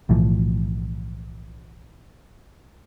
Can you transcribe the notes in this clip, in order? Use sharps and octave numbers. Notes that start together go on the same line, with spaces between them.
B1 A2 E3 F3